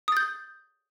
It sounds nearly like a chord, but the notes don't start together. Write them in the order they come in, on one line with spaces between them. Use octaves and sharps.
D#6 A6 G6